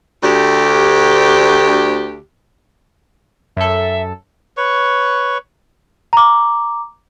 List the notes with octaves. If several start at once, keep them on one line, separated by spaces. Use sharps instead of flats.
D2 G4
F#2 A4 E5
B4 C#5 C#6
A#5 D6